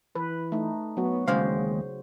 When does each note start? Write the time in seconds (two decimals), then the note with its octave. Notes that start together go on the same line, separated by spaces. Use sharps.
0.15 E3 B4
0.52 A3 D#4
0.97 F#3 B3 F#4
1.28 E1 D#2 C#3 G#3 C5 F5